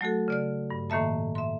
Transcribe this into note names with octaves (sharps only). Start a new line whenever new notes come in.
F#3 A3 F#4 A4
C#3 D5 F6
G2
A2 D#3 A#3 E5 A5
E5 C6